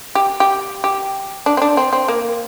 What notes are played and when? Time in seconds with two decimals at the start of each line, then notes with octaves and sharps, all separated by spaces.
0.15 G4
0.40 G4
0.84 G4
1.46 D4
1.57 C4
1.62 D4
1.77 C4
1.93 C4
2.08 A#3